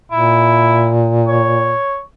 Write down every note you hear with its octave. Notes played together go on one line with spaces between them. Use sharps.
A#2 E4
C#5